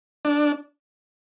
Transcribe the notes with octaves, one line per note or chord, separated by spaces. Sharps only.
D4